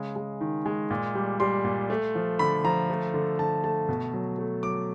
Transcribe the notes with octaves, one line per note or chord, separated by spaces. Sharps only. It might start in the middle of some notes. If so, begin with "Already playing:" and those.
Already playing: C#3 G#3
G#3
D#3
G#3
A#2
G3
G3 C6
A#2
A3
F3
D3 B5
F3 A#5
A3
D3
D3 A5
A3 A5
B2
F#3
A3
F#3 D6